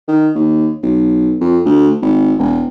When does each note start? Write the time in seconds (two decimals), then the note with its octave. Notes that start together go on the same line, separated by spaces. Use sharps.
0.08 D#3
0.35 D#2
0.83 B1
1.41 F2
1.65 D2
2.02 G#1
2.38 E1